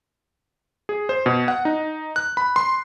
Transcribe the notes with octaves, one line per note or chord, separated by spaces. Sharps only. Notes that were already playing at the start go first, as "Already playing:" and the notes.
G#4
C5
B2
F#5
D#4
F#6
B5
C6